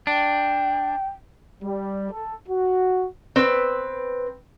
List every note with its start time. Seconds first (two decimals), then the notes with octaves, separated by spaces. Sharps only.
0.07 D4 G5
1.63 G3
2.11 A4
2.48 F#4
3.36 C4 B4